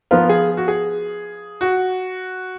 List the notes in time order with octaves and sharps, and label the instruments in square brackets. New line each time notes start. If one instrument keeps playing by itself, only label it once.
[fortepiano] F3 B3 F4 [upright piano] A#4
[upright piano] G#4
F#4
G#4
F#4